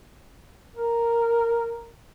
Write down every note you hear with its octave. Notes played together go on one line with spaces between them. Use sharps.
A#4